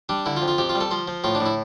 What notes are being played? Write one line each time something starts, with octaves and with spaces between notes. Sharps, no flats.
G3 D4
D3 E4
F4
F2
F4
F2 G4
F4
G3
A4
F3 C5
F3
A2 F4
D4
A2
E4